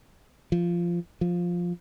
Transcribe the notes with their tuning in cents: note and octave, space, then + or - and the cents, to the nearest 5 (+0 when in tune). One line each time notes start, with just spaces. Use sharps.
F3 -15
F3 +5